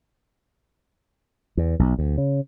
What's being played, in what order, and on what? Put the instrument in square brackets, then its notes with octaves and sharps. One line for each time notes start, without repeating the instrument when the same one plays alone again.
[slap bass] E2
B1
D2
C#3